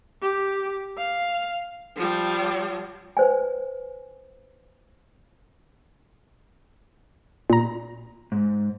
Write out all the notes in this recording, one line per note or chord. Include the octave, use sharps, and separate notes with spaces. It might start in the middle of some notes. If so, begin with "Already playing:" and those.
G4
F5
F3 G3
B4 C5 G#5
A#2 A#5
G#2